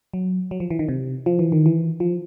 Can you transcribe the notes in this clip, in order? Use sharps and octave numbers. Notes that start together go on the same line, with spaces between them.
F#3
F#3
F3
E3
D#3
C3
F3
E3
D#3
E3
F3